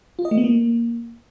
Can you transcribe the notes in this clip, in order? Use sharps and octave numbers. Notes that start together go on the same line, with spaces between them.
F4
D#5
A3
B3
A#3